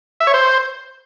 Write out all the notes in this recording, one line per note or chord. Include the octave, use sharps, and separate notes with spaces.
E5
C#5
C5